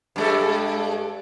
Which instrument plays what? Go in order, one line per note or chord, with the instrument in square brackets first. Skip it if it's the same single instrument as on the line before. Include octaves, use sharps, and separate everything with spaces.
[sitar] G2 G#3 A4